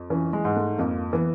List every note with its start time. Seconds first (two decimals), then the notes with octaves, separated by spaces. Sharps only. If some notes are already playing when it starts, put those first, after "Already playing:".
Already playing: F2
0.10 E3 C#4
0.33 G#3
0.45 G#2
0.56 A3
0.78 F2 A#3
1.13 E3 B3